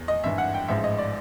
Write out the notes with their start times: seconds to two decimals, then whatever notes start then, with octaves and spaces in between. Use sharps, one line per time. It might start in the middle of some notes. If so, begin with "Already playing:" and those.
Already playing: E2
0.08 D#5
0.23 G#1 G2 E3 E5
0.38 F#5
0.54 G5
0.68 A1 G#2 F3 E5
0.84 D#5
0.98 D5